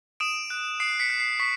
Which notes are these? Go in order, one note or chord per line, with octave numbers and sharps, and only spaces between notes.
D#6 D7 E7
F#6
D#6 C7 D7
B6 C#7
F#6
C7
C#6 B6